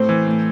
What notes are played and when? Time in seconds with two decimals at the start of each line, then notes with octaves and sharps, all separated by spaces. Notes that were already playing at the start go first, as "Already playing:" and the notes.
Already playing: A2 C4 C5
0.09 E3
0.27 A2